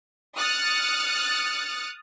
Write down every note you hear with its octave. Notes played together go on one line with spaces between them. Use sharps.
D#6 F6 F#6 A6 C#7